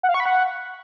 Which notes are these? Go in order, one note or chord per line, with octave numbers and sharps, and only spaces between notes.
F#5
F5
C#6
B5
F#5